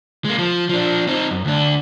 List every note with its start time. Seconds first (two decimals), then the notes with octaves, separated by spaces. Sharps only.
0.25 G#3 A#3
0.39 F3
0.69 F3 D4
1.08 C4 D#4
1.31 F#2
1.45 D2 D4